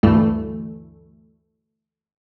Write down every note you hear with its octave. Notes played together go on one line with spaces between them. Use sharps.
D2 G2 E3 A3